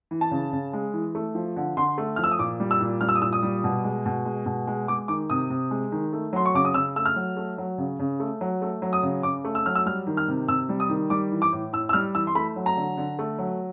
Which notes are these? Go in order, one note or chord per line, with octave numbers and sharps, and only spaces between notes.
E3
A5
C#3
C#3
G#3
E3
A3
F3
D3
D3 C6
A3
F3 F6
E6
D#6
A#2 D6
G3
E6
A#2
G3 F6
E6
D#6
A#2 E6
D#6
G3
B2
G#3
B2
G#3
B2
G#3
G#3 D6
D#3 D6
C3 D#6
C3
G#3
D#3
A3
F#3 C6
C#6
C#3 D6
D#6
C#3 E6
A3 E6
F6
F#3
A3
F#3
C#3
C#3
A3
F#3
A3
F#3
D#6
C#3
C#3 D6
A3
E6
F#3 F6
E6
G3 F6
D#3
F6
C3
C3 E6
G3
D#6
D#3
G3 D6
E3
D6
A2
A2 E6
E6
G3 F6
E3 E6
C6
A3 B5
F#3
A#5
D3
D3
A3
F#3